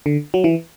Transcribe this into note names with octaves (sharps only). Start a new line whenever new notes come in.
D3
F#3
E3